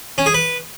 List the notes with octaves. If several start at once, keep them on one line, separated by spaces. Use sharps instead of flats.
C#4
G#4
B4